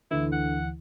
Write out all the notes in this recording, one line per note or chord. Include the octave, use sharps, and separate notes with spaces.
D2 D3 E3 E4
F#5